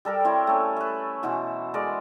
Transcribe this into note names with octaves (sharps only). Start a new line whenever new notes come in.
G3 A4 A#4 G5
C4 E4 C#5
A3 C#4
B4 E5
B2 E3 F#4 C5
G#3 A#4 D5